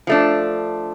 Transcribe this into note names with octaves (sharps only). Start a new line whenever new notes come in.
F3 A3 D4